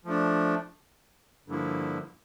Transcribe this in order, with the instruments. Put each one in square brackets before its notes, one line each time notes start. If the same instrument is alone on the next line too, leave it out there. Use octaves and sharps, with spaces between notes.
[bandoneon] F3 A3 D4
G2 D3 F3 A#3 E4